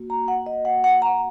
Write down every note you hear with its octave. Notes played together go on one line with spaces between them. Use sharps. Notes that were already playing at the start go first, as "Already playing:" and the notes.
Already playing: A#3 F#4
A#5
F#5
D#5
F#5
F#5
A#5